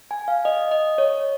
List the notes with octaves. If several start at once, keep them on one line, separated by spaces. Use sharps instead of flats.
G#5
F5
D#5
D#5
C#5